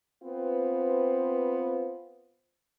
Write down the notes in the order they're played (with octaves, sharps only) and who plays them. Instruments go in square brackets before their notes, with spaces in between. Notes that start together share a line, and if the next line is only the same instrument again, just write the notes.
[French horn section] B3 C4 F4 B4 C5